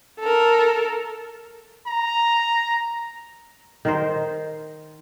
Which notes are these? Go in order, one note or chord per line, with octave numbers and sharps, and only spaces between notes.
A4 A#4
A#5
D#3 A#4 C5